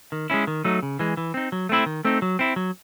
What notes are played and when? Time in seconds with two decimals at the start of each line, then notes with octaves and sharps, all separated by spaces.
0.12 D#3
0.30 G#3 C#4 E4
0.47 D#3
0.65 F#3 A3 D#4
0.83 C#3
0.99 E3 G#3
1.17 E3
1.34 C4 D#4
1.52 F#3
1.69 A3 C4 E4
1.86 D#3
2.05 A3 C4 D#4
2.22 F#3
2.39 C4 E4
2.56 F#3